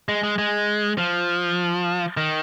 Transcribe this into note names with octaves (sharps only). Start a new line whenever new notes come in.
G#3
G#3
G#3
F3
D#3